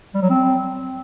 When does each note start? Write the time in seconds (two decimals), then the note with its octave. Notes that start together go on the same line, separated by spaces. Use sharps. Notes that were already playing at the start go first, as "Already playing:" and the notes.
0.14 G3
0.22 F#3
0.30 C4